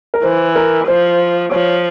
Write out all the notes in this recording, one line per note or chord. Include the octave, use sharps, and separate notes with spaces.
A#4
E3 C5
A#4
F3 C5
F3 C#5